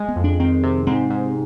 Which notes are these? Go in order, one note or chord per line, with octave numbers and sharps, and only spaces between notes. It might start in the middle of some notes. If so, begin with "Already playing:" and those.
Already playing: G#3
B3
F2
D4
D#3 C4
C3
G#2 C4
G#2